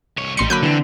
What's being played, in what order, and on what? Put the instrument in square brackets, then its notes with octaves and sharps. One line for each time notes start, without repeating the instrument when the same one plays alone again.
[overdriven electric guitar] C2 C#5
[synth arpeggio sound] A1 C6 C#7 [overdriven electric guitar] G3 D#4
[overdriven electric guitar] D3 [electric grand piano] F#3 A#3 [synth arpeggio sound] B5 F#6 G6
[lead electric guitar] D3 [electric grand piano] E3 [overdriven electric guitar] C4